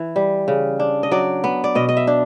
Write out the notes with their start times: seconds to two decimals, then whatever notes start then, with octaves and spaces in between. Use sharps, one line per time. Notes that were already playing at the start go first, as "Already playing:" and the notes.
Already playing: E3
0.16 G3
0.48 C#3
0.80 D4
1.03 D#5
1.11 F#3 D5
1.44 B3
1.64 D5
1.75 B2 D#5
1.89 D#5
1.97 E5
2.07 D4